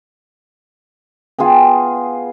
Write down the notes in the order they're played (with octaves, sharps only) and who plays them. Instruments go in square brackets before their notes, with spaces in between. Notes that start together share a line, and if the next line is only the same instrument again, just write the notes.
[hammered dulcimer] B3 F4 G#4 G5